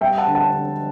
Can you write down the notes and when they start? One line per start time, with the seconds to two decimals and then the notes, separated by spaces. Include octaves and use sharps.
0.01 G3 E5 G5
0.18 F#5 A5
0.27 D3
0.35 F#5 A5
0.52 D3